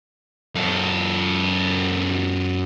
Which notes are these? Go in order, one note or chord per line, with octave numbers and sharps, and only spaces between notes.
F#2 A4